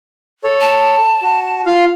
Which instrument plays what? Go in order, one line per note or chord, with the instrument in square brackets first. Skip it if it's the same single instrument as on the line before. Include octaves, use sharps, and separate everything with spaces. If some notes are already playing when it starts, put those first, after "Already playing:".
[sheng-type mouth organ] A4 C#5
[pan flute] A5
[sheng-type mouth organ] F#4
F4 F5